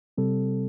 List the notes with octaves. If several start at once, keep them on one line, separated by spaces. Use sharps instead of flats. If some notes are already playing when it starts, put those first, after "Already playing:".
C3 G3 C4 A4